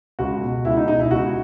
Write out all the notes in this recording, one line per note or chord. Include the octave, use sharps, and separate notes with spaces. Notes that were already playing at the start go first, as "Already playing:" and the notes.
C#2 F#4
B2
C#2 E4
D#4
B2 D#4
E4
C#2 F#4